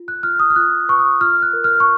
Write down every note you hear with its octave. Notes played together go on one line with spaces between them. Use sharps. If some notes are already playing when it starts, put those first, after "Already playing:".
Already playing: F4
F#6
F4 F6
D#6
F6
F4 F#6
B4 C#6
D#6
F4 F6
F#6
A#4
F6
C#6